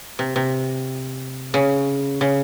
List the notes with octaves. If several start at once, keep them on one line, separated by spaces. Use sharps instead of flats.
C3
C3
C#3
C#3